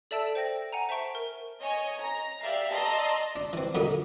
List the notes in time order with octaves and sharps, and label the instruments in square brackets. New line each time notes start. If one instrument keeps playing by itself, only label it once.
[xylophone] A4 D5 E5 A5 E6 D7
C5 G5 A#6
F#5 G#5 A#5
C5 E5 A5 C#6 D7
A#4
[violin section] C#5 D#5 G#5
A#5
G4 D5 E5 F5
D5 D#5 A5 A#5 C6 E6
[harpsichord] D4
E3 C4
F#2 A#2 D3 D4 D#4